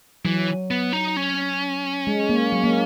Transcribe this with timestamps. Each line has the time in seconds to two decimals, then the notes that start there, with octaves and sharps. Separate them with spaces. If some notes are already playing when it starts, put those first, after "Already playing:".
0.25 E3 F#3
0.71 B3
0.93 D#4
1.17 C#4
2.07 G#3
2.29 A#3
2.52 F#3
2.64 A#3